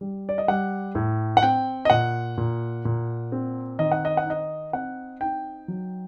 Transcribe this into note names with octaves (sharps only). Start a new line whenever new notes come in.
G3
D5
D#5
G3 F#5
A2
F#5
C4 G5
D#5
A#2 F#5
A#2
A#2
C4
D#3 D#5
F#5
D#5
F#5
D#4 D#5
C4 F#5
D#4 G5
F#3